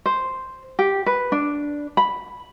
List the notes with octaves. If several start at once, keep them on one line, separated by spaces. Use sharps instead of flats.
C5
G4
B4
D4
B5